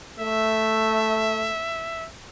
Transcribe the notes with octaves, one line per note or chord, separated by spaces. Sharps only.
A3 E5